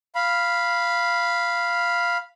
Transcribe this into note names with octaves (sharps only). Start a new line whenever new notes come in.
F5 B5